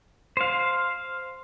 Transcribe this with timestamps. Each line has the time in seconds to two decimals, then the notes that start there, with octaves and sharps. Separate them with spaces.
0.37 C5 F5